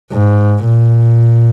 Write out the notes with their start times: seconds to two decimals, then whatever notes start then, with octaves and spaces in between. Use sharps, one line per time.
0.12 G#2
0.65 A#2